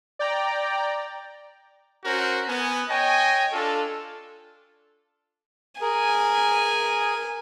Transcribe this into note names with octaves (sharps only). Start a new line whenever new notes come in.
D5 G5 A#5
C#4 F#4 A#4 C5
B3 G#5
C#5 D#5 G5 G#5
D4 F4 A4
G#4 A#4 G#5